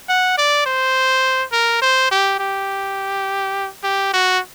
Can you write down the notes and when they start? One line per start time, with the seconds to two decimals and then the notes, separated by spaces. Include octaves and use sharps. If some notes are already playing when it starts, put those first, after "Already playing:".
0.09 F#5
0.38 D5
0.66 C5
1.52 A#4
1.82 C5
2.11 G4
2.39 G4
3.84 G4
4.13 F#4